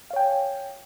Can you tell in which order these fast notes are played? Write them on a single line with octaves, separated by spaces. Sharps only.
F5 C#5 G5 G#5